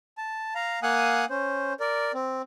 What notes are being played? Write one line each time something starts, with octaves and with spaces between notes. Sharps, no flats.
A5
F5 A#5
A#3 F5 F#5 G#5 D#6 F#6
C#4 C5
A#4 D5
C4